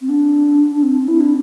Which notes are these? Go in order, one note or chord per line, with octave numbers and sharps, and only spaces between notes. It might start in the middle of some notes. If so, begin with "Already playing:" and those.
C4
D4
D4
C4
E4
D4